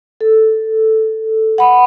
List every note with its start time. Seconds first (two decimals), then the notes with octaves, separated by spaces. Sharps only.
0.21 A4
1.58 F#5 B5